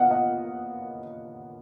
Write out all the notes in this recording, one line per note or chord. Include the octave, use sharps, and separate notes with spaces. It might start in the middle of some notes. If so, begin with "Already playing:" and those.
Already playing: A#2 B3 D#5 F5 F#5
D#5 F#5